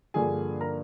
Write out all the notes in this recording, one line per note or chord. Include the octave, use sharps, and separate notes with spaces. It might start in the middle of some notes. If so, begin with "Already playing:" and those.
G2 D3 F3 A#3 G#4 G#5
A#4 A#5